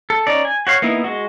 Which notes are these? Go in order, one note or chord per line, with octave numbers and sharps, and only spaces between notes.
A4
C#4 D#4 D5
G#5
F#4 C#5 F5
A#3 B3 D#4 E4
G#3 F#4